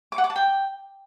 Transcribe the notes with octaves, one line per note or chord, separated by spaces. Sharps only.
D6
F#5
D6
A5
G5